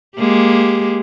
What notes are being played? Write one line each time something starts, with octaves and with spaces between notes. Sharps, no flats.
G#3 A#3 G4